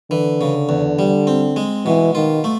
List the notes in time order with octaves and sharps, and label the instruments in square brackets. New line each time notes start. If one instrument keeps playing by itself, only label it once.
[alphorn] D3 [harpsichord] E3
[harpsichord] C#3
E2
G3
C4
G#3
[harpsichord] B2 [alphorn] E3
[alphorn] D#3 [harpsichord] F4
[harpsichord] A3